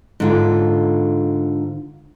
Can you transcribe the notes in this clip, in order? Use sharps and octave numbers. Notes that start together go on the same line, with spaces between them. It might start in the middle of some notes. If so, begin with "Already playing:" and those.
G#2 D3 F4